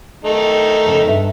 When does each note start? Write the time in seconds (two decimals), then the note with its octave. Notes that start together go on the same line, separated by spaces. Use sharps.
0.25 D#3 A3 D#4
0.86 F2 C#3
1.07 G2 E5